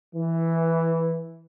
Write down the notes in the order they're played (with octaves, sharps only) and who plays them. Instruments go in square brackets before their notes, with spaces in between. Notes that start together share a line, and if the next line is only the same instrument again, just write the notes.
[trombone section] E3